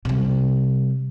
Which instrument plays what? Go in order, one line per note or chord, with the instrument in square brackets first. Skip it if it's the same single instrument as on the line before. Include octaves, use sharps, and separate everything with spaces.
[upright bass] C3 G3